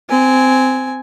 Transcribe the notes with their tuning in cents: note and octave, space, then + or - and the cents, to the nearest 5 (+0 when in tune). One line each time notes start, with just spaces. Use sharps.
C4 -15 G#5 +0